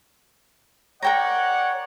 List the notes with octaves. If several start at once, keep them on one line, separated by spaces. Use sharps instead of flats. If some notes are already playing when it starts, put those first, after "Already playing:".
A#4 C#5 D5 F#5 G5 A#5